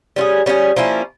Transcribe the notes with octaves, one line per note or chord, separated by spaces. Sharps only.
G3 C#4 F4 G#4
G3 C#4 F4 G#4
F3 A#3 C#4 E4